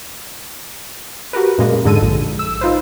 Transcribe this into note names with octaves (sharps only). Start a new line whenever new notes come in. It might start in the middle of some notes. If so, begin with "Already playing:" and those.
F#4 G4 A#4 B4
F#2 A#2 G#3 A#3
F2 G#2 D3 G#3 A4 D#7
A#1
E6
D#4 F4 B4 C5